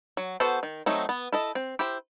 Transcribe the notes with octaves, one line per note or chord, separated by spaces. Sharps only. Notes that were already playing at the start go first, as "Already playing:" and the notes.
F#3
B3 F#4 A4 C5
D#3
F#3 A3 C4 D#4
B3
E4 A4 D#5
C4
E4 G4 C5